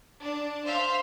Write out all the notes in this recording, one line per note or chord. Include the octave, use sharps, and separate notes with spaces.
D4 A5
C5 E5 F5 C6